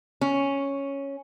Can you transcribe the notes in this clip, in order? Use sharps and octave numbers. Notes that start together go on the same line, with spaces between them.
C#4